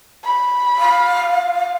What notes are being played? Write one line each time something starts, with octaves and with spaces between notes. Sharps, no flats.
B5
F5